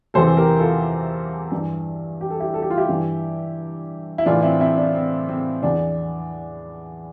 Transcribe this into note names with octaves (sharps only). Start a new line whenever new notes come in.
E2 C3 E3 A4 C5
G4 A#4
F4 A4
G2 E3
G4
A4
E4 G4
A4
G4
F4
E4 G4
G2 E3
E4
A2 E3 D4 F4
C4 E4
C4 E4
D4
C4
C4
E2 E3 D4